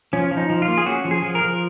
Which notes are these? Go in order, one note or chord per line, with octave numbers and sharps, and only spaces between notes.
F3 C#4
F3
D#4
F3
F4
A#3
G#4
C#4 F#4
F3
G#4
F3
A#4
F3